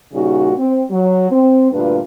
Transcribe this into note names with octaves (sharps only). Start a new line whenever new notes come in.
A#2 C#3 G3 D#4 F#4
C4
F#3
C4
D2 G2 A#2 D4 F4 B4